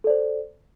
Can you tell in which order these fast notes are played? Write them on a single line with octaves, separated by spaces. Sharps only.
A4 D5 C5